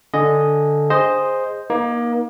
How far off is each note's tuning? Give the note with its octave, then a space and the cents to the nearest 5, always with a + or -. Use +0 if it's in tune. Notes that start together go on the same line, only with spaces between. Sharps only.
D3 +0 D#5 +0 G#5 +0
G#4 -20 C5 +0 D#5 +0
A#3 +30 D#4 +0